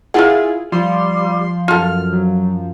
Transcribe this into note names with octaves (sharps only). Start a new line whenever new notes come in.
E4 F4 G#4 A#4 C5 F#5
F3 G3 C6
F#2 F4 A4 F6
F#3